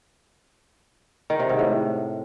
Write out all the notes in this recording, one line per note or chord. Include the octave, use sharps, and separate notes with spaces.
D#3
C3
G#2
A2